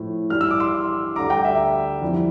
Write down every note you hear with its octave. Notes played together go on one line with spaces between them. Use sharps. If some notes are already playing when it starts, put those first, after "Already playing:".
Already playing: A2 F3
G2 E3 G3 F6
E6
D6
C6 E6
D2 D3 G3 A#5 D6
G5 A#5
E5
F2 E3 G3